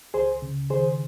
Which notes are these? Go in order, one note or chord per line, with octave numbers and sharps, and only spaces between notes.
C#2 G#4 C5
C#3
D#3 G#4 C5